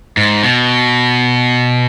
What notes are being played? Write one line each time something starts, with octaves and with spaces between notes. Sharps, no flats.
G#2
B2